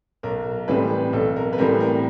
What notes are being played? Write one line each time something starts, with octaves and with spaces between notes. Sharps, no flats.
B1 A#4
A2 E3 G3 C4 B4
B1 A4
A#4
B4
A2 E3 G3 C4 A#4
A#4